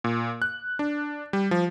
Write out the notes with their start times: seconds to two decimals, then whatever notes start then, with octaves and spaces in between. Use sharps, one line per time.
0.04 A#2
0.42 F#6
0.79 D4
1.33 G3
1.51 F3